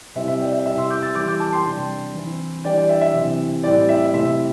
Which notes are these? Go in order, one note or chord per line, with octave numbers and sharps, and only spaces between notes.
C3 G3 C4 E4 E5
E5
D5 G5
E5
C3 G3 E4 E5
C6 E6
D6 G6
E6 A6
E3 G3 E4 D6 G6
D6 G6
A5 D6
G5 C6
C3 G3 D4
E3 C4 E4
E3 G3 D4 D5 G5
D5 G5
E5
E5
C3 E3 C4
A2 G3 C4 E4 D5 G5
E5
C3 A3 C4 E4 E5